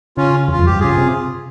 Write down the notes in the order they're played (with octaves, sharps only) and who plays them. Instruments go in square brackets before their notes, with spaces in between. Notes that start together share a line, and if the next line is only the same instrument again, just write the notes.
[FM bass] C#3 [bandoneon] C#4 F4
[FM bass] E2 [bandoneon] F4
[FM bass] F2
[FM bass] G2 [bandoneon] G4
[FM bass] C#3 [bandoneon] F4 G#4
[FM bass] C3